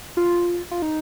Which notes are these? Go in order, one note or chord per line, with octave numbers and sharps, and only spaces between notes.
F4
F4
D#4